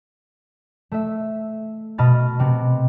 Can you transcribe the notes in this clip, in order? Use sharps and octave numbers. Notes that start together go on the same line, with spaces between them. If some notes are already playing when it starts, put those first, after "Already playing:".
A3 E5
B2 D#5 A5 B5 F6 A6
C3 B3 C4